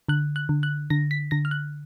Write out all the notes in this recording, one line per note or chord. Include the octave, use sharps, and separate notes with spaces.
D3 F#6
F#6
D3
F#6
D3 A#6
B6
D3 A#6
F6
F#6